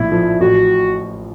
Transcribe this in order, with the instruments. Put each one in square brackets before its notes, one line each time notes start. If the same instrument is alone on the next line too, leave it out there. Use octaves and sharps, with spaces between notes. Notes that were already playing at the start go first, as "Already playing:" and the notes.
Already playing: [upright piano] A#1 A2 [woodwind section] E4
[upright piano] F3
[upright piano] A1 [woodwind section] F#4